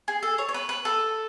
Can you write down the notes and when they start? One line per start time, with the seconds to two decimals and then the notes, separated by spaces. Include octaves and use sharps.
0.08 G#4
0.23 A4
0.38 C#5
0.49 C#5
0.54 B4
0.69 B4
0.85 A4